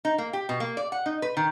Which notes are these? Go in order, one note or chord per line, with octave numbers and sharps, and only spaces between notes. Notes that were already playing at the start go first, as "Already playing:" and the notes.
D#4
A#3
G4
B2
A#3
D5
F#5
D#4
B4
D#3